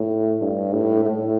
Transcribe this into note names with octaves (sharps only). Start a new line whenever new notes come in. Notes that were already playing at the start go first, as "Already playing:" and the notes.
Already playing: A2
G2
A2
A2